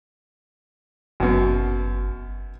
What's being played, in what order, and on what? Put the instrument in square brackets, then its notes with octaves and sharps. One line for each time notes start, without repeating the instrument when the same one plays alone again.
[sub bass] G1 [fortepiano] F#2 B2